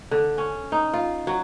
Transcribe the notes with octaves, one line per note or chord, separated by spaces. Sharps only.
D3
C#4
D#4
F4
F#3